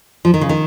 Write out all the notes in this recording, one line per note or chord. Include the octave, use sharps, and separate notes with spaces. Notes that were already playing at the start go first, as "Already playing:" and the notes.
F3
D#3
C#3
D#3